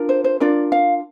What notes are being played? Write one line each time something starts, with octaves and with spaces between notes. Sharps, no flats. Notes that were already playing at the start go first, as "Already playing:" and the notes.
Already playing: D4 F4 A#4
C5
C5
D4 F4 A#4 D5
F5